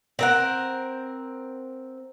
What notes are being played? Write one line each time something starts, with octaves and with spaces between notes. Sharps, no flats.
C4 A#4 F#5